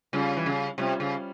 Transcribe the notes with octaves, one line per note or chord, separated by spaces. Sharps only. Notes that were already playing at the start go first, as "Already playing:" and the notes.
C#3 G3 C#4 F4
E3
C#3
C3 G3 C#4 F4
C#3